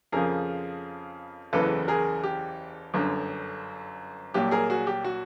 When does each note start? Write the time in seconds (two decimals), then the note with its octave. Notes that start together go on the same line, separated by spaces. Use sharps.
0.12 F2 C#3 F3 G#4 A#4
1.53 F#1 E2 C#3 E3 A4 B4
1.88 G#4 A#4
2.23 G4
2.94 G1 F#2 D3
4.34 C2 A#2 F#3 G4
4.51 G#4 A#4
4.70 F#4 G#4
4.87 G4
5.04 F#4